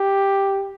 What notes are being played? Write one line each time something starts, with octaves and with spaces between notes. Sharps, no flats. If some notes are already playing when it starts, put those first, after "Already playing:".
Already playing: G4